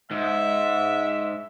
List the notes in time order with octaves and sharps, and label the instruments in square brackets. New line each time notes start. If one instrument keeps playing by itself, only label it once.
[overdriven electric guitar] G#2 [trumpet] E5